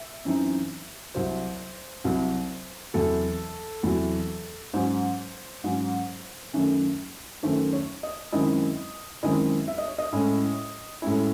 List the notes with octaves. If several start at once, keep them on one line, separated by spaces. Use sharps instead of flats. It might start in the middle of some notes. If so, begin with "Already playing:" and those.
Already playing: E5
F#2 E3 C4 D#4
C2 C3 F#3 C5
C2 C3 F#3
E2 C3 F#3 A4
E2 C3 F#3
G#2 F#3 C#4 C5
G#2 F#3 C#4
F#2 D#3 A3 C#4
F#2 D#3 A3 C#4 C5
C#5
D#5
F#2 D#3 G#3 C4 E4 D#5
F#2 D#3 G#3 C4 E4 D#5
E5
D#5
C#5
D#5
A2 G#3 C#4 E4
A2 G#3 C#4 E4